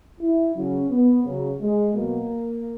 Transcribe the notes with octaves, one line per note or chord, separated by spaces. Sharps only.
E4
C#3 F#3 C#4
B3
C#3 F#3
G#3
B2 F#3 A#3